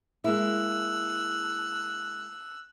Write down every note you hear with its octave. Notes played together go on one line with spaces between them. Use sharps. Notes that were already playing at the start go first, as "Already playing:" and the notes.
G#3 A#3 E4 E6 F#6